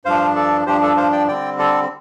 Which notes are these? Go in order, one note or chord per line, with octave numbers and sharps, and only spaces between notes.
G2 F3 D4 C5 F5
A4 D5
G2 F3 D4 G4 C5
A4 D5
C5 F5
D5 G5
D3 G3 C4 D5 G5
A4 D5